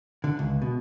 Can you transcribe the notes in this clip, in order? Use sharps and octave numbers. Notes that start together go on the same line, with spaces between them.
D3
C#2
B2